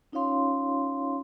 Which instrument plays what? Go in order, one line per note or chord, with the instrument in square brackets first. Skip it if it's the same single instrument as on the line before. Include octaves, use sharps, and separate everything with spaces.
[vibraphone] C#4 D#4 F4 C#5 F5 C6